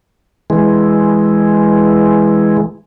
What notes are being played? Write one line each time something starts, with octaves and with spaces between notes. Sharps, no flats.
E3 G#3